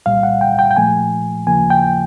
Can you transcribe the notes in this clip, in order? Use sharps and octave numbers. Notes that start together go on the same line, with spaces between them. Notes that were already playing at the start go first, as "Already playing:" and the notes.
C2 A#2 G3 F5
F#5
G5
G5
G5
A#2 F3 A3 G#5
D#2 C#3 F3 A#3 G#5
G5